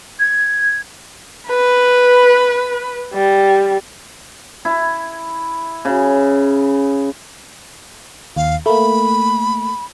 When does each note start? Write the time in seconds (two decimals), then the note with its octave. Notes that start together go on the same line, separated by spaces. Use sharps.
0.20 G#6
1.47 B4
3.14 G3
4.65 E4
5.85 C#3
8.36 D#2 F5
8.66 A3 A#3 B5